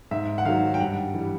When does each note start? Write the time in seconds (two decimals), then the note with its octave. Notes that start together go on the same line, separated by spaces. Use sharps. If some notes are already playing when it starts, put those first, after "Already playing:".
0.11 G#2 E5
0.38 F#5
0.45 D#3 F#3 F5
0.74 G5
0.80 G2 F#5
1.14 E3 G3